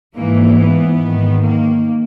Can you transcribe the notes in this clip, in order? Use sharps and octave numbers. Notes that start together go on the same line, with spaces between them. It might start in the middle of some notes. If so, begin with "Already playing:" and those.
G#2 E3 A#3
B3
G#2 D#3
A#3